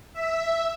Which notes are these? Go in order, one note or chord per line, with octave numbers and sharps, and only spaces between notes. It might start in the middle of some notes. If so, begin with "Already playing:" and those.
E5